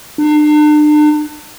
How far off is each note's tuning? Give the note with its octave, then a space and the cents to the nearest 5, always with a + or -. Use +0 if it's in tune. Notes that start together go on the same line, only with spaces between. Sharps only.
D4 +40